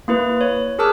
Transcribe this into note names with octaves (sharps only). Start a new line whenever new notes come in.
A#3 E4 B4
C#5
G#4 A#4 A5 D6 E6 F#6